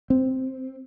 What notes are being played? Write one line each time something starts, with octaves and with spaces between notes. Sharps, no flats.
C4